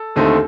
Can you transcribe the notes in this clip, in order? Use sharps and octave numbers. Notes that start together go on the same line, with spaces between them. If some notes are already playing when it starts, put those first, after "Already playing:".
Already playing: A4
D#2 D3 A3 C4 D#4